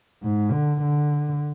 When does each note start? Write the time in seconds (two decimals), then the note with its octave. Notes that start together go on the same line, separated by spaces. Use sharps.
0.23 G#2
0.52 D3
0.82 D3